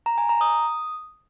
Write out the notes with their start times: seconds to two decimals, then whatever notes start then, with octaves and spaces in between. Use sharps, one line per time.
0.06 A#5
0.18 G#5
0.29 A#5
0.41 D#6